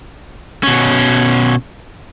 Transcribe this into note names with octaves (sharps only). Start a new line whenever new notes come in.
B2 C#4